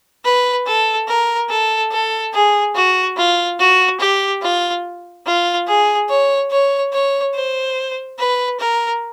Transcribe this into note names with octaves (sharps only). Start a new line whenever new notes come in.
B4
A4
A#4
A4
A4
G#4
F#4
F4
F#4
G4
F4
F4
G#4
C#5
C#5
C#5
C5
B4
A#4